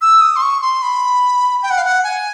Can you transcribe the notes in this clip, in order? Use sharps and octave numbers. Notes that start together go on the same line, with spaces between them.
E6
D#6
C6
C#6
C6
B5
G5
F#5
F5
F#5
G#5